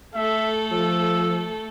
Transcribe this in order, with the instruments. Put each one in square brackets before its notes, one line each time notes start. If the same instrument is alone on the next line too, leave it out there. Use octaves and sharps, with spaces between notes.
[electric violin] A3 A4 [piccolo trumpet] E5
[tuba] F3 [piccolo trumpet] E6